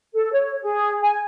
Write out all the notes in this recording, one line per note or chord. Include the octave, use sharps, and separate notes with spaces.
A4
C#5
G#4
G#5